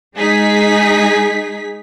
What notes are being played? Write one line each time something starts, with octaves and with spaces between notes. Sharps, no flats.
G#3 D#4 G#4 B6